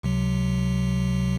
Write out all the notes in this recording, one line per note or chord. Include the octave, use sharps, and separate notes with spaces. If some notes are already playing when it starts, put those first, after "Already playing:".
C#2 C3 F#3